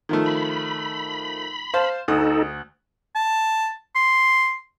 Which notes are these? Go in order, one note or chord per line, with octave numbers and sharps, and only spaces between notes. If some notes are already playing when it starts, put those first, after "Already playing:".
D#3 F3 A3
B5
C5 F5 A5
D2 D#4 A4 D#6
A5
C6